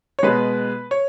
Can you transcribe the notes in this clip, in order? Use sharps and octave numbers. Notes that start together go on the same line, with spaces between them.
C#5
B2 G#3 B4
C#5